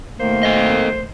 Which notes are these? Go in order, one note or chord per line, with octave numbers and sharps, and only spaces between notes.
B2 D#3 A3 A#3 C5
A4 D#5